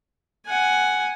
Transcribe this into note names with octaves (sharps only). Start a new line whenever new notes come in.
F#5 G#5